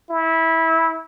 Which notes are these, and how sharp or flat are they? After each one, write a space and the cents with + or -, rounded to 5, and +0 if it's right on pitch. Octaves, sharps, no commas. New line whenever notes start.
E4 -20